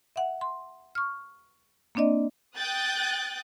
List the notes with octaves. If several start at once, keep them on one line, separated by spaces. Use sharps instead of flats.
E5 F#5
C6
C#6 F6
A#3 C4 D4 D5 D#5
G5 D#6 F#6 G6 A6